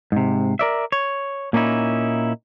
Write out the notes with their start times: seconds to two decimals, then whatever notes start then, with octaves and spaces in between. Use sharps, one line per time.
0.12 G#2 C3
0.59 A#4 D5 E5
0.92 C#5
1.53 A#2 A#3 C#4 D#4 E4